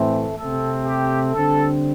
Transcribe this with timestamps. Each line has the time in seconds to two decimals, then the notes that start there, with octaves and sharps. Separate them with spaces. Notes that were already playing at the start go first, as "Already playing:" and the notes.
Already playing: A2 E3 A3 C4
0.37 C3 A3 C4 A4
0.86 G4
1.33 D3 G3 C4 A4